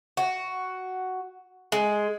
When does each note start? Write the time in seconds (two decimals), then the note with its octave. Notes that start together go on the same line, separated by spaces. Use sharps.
0.17 F#4
1.72 G#3